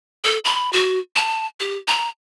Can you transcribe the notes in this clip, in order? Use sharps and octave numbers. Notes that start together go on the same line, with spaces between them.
A4
B5
F#4
A5
G4
A#5